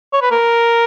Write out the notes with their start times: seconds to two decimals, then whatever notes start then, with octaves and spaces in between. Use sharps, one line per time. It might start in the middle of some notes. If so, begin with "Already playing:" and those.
0.13 C#5
0.22 B4
0.31 A#4